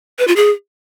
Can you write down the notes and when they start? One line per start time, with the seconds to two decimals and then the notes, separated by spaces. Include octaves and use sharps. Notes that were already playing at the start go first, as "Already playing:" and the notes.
0.19 B4
0.28 F4
0.36 G#4